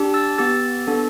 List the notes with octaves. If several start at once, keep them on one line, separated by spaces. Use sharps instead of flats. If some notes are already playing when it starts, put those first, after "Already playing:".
Already playing: D4 G4
E6 A6
B3 G4 E6 A6
B3 D4 A4